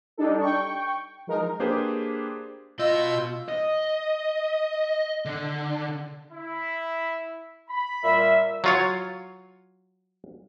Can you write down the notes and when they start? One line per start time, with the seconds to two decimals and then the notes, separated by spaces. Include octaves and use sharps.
0.17 G3 D4 D#4 A4
0.41 G5 C#6
1.27 F3 G#3 D#4 A#4
1.60 A#3 D4 G4 G#4 B4 C5
2.79 B2 F4 D#5 E6 G6
3.49 D#5
5.25 D3
6.32 E4
7.69 B5
8.03 A#2 G3 E5
8.64 F#3 F4 C#5